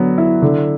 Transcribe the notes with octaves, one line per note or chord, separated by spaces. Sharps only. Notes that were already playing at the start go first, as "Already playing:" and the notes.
Already playing: D3 F#3 B3
E4
D3